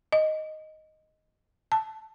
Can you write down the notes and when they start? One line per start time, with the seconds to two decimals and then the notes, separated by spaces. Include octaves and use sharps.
0.12 D#5
1.72 A5